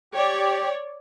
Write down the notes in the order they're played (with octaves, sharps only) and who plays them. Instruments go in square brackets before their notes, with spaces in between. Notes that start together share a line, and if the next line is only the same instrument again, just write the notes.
[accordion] G4 [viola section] C#5 D5